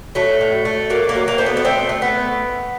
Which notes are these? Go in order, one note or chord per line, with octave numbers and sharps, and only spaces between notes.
F#3 A3
A2
A3
F#3 A#3
A#3
F#3
A#3
A3 C4
B3
B3
A3 C4
A3
B3